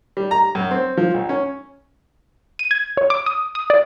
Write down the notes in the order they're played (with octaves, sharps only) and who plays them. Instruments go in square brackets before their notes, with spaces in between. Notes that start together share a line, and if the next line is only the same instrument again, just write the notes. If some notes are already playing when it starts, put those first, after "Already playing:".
[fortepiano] G3
A#5
F#2
C4
F3
B1
C#4
[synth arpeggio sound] D#7
G#6
C#5
D6
D#6
D#6
D5